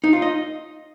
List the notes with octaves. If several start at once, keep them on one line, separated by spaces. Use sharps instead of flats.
D#4
F4
D#5